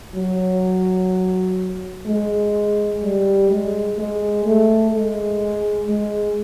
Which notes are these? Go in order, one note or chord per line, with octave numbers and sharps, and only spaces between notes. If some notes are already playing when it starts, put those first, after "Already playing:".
F#3
G#3
G3
G#3
G#3
A3
G#3
G#3